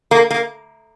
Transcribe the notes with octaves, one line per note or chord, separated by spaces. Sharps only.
A#3
A#3